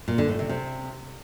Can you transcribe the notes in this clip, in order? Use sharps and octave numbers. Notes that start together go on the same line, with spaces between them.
A#2
D3
A2
C3
C3